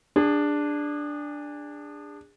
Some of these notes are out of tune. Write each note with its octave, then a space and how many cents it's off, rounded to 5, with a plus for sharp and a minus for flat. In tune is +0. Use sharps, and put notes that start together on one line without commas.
D4 +0 G#4 -30